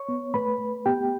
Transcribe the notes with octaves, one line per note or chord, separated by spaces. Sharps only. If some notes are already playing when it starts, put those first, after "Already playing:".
Already playing: C#5 C#6
B3
A3 B4 B5
A3
B3 G4 G5